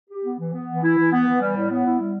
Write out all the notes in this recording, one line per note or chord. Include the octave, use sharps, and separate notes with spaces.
G4
B3
E3
B3
E3
E4
E3
B3
E3
G3
A2
B3
E4
G3